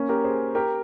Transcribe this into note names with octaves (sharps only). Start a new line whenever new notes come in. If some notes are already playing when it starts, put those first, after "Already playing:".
Already playing: A#3 C#4
G4 A#4
G#4 C5
G4 A#4